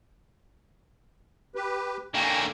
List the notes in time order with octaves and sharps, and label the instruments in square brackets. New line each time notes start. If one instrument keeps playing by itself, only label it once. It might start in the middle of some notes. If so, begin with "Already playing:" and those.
[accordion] G4 B4
[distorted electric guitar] D3 A#3 [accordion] G5 G#5 C#6